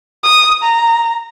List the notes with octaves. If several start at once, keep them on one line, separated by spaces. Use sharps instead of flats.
D#6
A#5